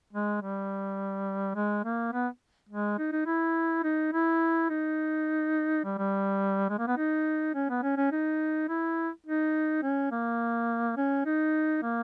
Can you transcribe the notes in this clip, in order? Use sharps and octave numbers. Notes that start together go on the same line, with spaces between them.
G#3
G3
G#3
A#3
B3
G#3
D#4
D#4
E4
D#4
E4
D#4
G3
G3
G#3
A#3
B3
D#4
C#4
B3
C#4
C#4
D#4
E4
D#4
C#4
A#3
C#4
D#4
A#3